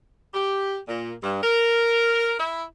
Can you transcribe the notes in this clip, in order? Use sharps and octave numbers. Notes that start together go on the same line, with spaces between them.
G4
A#2
G2
A#4
E4